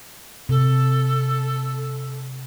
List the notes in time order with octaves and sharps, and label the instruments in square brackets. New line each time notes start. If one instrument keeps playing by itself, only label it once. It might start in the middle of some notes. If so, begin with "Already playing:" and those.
[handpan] C3 [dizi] A4